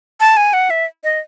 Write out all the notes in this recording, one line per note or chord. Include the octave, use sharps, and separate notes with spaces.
A5
G#5
F#5
E5
D#5